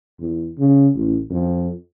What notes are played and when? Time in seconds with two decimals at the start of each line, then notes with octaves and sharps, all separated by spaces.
0.20 E2
0.58 C#3
0.95 A1
1.30 F2